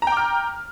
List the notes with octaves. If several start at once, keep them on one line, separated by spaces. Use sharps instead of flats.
G5 A#5 D6 F6